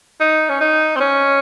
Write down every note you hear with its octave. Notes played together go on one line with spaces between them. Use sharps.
D#4
C#4
D#4
C4
C#4